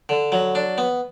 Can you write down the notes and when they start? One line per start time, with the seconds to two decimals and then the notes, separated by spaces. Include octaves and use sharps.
0.09 D3
0.32 F#3
0.55 D4
0.78 B3